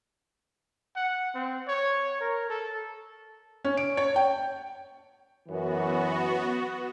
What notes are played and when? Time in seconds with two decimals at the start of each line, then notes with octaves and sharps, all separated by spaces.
0.96 F#5
1.35 C4
1.68 C#5
2.20 A#4
2.50 A4
3.65 C#4
3.77 D7
3.97 C#5
4.16 G5
5.48 F#2 E3 B3 F#4